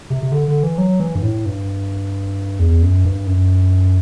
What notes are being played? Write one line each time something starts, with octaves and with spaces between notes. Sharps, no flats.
C3
C3
D3
D3
E3
F#3
E3
G2
A2
G2
E2
F#2
G2
F#2